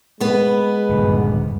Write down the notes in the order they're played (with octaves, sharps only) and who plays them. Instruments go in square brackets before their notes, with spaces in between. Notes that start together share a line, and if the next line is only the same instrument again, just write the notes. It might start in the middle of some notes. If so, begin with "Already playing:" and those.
[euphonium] G#3 [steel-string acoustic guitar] B3 B4
[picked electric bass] D#1 G2 D3